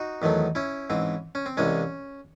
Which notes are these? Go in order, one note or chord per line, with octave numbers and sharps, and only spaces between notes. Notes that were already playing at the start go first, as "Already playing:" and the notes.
Already playing: D#4 F#4
E2 D#3 F#3 A3
C#4 E4
G#2 E3 C4
C#4
C4
C2 C3 E3 G#3 C#4